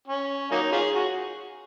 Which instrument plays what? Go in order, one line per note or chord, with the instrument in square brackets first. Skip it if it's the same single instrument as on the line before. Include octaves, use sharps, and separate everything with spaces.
[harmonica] C#4
F#3 A#3 D#4
C#4 F4 G#4
F#4